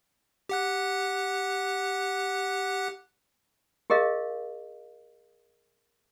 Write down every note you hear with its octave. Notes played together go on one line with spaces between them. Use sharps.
G4 F#5 F#6
G4 G#4 A#4 D#5 F5